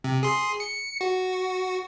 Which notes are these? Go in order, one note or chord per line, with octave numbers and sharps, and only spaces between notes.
C3
G#4 C6
C#7
F#4